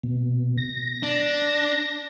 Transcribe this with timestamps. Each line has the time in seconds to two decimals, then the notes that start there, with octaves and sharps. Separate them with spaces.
0.03 B2
0.57 A#6
1.03 D4